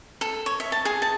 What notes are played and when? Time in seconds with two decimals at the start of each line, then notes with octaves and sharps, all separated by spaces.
0.21 A4
0.46 C#5
0.60 E5
0.72 A5
0.85 G#4
1.02 A5